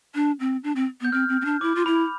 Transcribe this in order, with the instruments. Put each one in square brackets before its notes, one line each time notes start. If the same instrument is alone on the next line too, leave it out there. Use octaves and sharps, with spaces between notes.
[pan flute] D4
C4
D4
C4
[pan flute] B3 [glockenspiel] G6
[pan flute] C4 [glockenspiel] F6
[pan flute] C4
C4
D4
[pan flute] E4 [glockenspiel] D6
[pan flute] F4
[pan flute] E4 [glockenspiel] B5